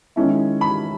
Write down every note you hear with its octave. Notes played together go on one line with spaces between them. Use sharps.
D#3 G#3 C#4 E4
B5